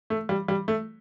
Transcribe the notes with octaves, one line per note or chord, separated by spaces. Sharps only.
A3
G3
G3
A3